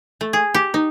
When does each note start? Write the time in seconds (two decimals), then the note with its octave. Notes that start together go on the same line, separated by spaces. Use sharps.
0.21 A3
0.33 G#4
0.54 G4
0.74 D#4